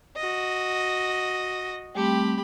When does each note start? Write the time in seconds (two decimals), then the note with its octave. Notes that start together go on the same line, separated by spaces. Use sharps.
0.16 F#4 D#5
1.95 G3 A3 C4 G4 B5